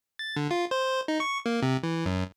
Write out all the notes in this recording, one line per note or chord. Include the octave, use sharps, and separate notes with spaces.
A6
D3
F4
C5
D#4
C#6
A#3
C3
E3
F#2